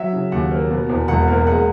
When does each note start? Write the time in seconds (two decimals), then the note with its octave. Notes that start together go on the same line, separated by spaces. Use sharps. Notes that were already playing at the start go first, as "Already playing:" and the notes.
Already playing: F#3 E5
0.13 C#3
0.32 D#2 F#5
0.51 A#3
0.70 B2
0.89 E2
1.08 E1 F#5
1.28 A#3
1.47 G#3 F#5